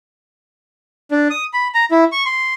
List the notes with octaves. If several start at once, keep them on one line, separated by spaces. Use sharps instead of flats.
D4
D#6
B5
A#5
E4
C#6
C6